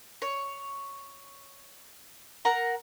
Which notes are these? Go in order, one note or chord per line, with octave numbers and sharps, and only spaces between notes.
C#5
A#4 F#5 A#5